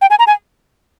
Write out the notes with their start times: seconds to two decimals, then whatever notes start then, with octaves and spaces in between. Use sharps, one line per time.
0.02 G5
0.10 G#5
0.19 A#5
0.27 G#5